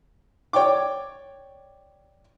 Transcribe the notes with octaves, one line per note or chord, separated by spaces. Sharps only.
C#5 D5 G5 D6